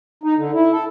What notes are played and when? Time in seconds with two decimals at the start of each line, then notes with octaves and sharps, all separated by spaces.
0.23 D#4
0.37 D3
0.54 E4
0.72 A4